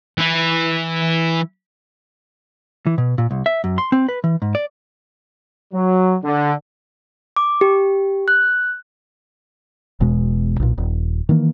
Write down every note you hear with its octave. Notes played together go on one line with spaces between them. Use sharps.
E3 E4
E3
B2
A#2
C2
E5
F#2
C6
C4
B4
E3
G#2
D5
F#3
D3
D6
G4
F#6
E1 B2 G#3
B1 A#2
D#1
D#3 E3 A#3